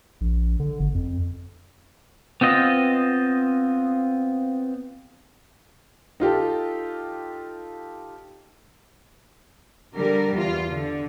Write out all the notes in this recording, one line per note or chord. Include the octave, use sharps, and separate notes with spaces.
A#1
D3
G1
F2
B3 C4 F4 D#5
D#4 F4 G4 A4
D3 G3 A#4
E2 F4
D3